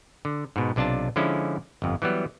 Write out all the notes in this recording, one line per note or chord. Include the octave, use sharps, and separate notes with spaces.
D3
G#2 B2
B1 C3 D4 F4 A5
D3 F3 G#3 C#4 E4
G1 F2
E3 F#3 G3 B3